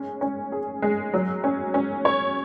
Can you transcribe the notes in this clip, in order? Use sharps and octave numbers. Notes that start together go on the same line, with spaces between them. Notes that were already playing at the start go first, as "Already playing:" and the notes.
Already playing: G#3 C#4
C#4
G#4
G#3
F#3
C#4
C#4
C#5